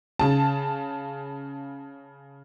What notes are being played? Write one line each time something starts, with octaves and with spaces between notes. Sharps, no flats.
C#3 A5